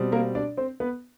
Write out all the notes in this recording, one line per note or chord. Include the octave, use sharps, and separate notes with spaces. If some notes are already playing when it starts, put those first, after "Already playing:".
Already playing: B2 G3 C4
A#3 A#4
D4 D5
C4 C5
B3 B4